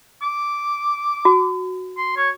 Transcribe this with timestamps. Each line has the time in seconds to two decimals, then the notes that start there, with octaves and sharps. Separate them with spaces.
0.22 D6
1.25 F#4
1.98 C6
2.17 C#5